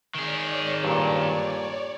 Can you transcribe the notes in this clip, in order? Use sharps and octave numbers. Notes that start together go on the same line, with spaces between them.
D#3 G#4 C#5 D5
G2 A#2